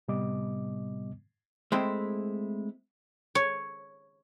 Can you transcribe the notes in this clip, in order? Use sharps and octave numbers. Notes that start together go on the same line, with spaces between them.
A2 C3 G3 B3 D#5 D6
G#3 A3 C4 E4
C#5